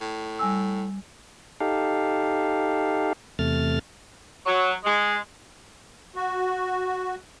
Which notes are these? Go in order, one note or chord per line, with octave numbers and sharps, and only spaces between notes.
A2
G3 G#5 E6
D#4 G4 A4 F5
E2 C3 A3 F6 A6
F#3
G#3
F#4